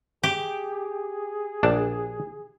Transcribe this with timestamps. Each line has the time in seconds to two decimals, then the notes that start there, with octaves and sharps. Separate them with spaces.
0.23 G4 G#4
1.63 A#1 D4 A5